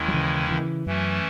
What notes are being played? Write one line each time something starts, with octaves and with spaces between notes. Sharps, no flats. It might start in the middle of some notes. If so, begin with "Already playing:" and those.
Already playing: D#2 D#3 G#3 C#4 E4
F#3
C#3 E3
C#3 E3
F#2 E3 A3 C#4